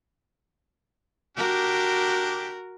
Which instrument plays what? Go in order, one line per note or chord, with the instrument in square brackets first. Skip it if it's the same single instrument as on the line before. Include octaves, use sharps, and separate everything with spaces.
[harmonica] D4 G4 [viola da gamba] F#4 A#4